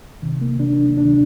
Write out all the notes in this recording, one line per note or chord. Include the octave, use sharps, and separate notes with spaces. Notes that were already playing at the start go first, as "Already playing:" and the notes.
D2 C3 D#3
A#3
D2 C3 D#3 D4
D2 C3 D#3 D4